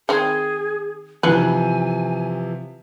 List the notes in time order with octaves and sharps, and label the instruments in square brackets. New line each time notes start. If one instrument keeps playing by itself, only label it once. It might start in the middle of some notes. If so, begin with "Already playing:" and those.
[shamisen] D#3 C4 [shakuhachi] G#4
[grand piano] C3 E3 F3 [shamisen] D#4 F4 B4 [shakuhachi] G#5